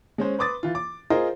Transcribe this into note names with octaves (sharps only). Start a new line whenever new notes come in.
G#3 C#4 C5
B4 C6 D6 D#6 A6
E3 F4
D6
F4 G#4 A#4 C5 D#5